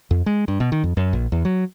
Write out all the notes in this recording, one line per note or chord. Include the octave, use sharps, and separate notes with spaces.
F2
G#3
G2
B2
D#3
F2
F#2
A#1
E2
F#3